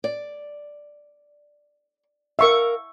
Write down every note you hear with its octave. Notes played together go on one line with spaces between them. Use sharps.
D5
A#4 E5 F5 C#6